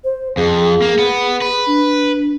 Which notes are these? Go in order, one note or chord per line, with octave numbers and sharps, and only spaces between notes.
C5
F2 G#4
A#3
B3
B4
D4